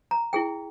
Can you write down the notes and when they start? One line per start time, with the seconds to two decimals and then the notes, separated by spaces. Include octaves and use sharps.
0.11 A#5
0.33 E4 G#4 G5